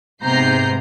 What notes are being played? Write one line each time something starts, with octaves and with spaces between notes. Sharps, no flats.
G#2 C3 B3 A#5 G6 C7